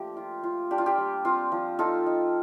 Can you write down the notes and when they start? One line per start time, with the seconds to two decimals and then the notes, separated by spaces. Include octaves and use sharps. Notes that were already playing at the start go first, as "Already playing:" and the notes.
Already playing: F3 A3 A#3 D4 G4
0.17 F4
0.43 F4
0.71 D4 G4
0.78 F4
0.86 G4
0.98 G3
1.25 C4 F4
1.52 F3
1.79 D#4 F4 A4
2.06 D#4